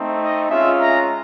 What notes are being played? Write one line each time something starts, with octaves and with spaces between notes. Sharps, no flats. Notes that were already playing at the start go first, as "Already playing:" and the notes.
Already playing: A3 C4 D#4
D#5
G#3 C#4 F4 E5
A#5